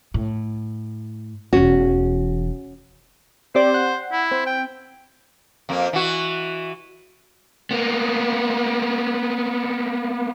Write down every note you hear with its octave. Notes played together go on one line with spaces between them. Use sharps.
A2
E1 E2 C#4 F#4
C4 G4 C5 D5
F#5
E4
C4
G5
F2 A#3
E3 F#4
A#3 B3